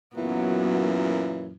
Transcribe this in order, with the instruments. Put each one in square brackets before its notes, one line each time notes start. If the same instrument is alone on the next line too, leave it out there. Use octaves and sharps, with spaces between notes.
[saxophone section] F#2 A#2 E3 [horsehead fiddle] F#3 B3